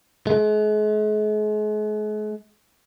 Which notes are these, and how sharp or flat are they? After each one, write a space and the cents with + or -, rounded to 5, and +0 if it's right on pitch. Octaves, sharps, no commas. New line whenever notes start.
G#3 +40